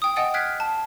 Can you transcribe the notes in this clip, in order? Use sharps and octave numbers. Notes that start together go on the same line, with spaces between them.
G5 D#6
D#5 F#5 G#5 D#6 A6 D7
F6 F#6 G#6 B6 C7 D7
A5